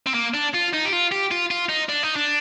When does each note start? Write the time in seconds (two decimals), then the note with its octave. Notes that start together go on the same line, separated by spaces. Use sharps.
0.07 C4
0.14 A#3
0.34 D4
0.54 F4
0.73 D#4
0.85 G4
0.92 F4
1.11 G4
1.31 F4
1.51 F4
1.69 D#4
1.89 D4
2.03 D#4
2.16 D4